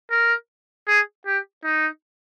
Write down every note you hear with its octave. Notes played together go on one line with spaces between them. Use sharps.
A#4
G#4
G4
D#4